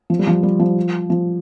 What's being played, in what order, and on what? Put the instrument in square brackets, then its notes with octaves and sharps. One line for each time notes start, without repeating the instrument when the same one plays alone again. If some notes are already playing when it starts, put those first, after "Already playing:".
[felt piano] F3
G3
F3
G3
F3
F3